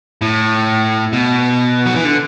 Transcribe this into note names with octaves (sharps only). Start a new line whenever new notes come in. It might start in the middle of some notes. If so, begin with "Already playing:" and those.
A2
B2
F#3
E3
D3